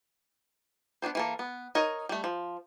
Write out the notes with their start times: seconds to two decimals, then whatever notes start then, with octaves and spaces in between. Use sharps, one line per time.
1.02 B3 D4 G#4 C5
1.15 E3 A#3 A4
1.39 B3
1.75 D#4 A#4 C#5 D#5
2.09 G3 A3
2.24 F3